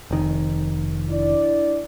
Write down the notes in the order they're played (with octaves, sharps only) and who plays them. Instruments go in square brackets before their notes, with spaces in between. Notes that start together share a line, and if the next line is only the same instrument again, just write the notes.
[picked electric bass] F1 D#3
[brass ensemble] D4 E4 D5